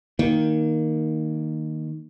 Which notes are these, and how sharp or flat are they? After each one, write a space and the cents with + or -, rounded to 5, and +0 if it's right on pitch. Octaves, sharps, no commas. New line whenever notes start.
D#3 +0 A#3 +0